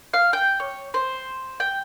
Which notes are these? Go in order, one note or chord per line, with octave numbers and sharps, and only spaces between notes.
F5
G5
C#5
C5
G5